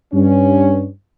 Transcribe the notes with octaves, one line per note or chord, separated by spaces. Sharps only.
G2 C#4